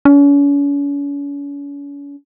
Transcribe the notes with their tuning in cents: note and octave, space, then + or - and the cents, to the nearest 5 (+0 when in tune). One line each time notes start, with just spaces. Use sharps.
C#4 +40